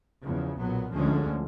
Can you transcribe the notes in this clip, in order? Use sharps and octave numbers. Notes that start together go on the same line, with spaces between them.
E2 C#3 F3
B1 A#2 F#3 B3
D2 D3 F3 G#3 C#4